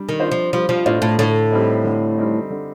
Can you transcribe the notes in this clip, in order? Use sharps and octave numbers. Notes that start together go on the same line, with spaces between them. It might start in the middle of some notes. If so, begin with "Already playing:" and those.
Already playing: G3 D4
D#3
D4 F4 C5 D#5
F3
F3 G3
F3
A2 D4 F4 C5 D#5
A2
A2 D3
G3 C4 D#4
D3
G3 C4 D#4
D3